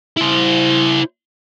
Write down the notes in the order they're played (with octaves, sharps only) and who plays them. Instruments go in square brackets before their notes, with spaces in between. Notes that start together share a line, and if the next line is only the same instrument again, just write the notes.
[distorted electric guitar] E4 C5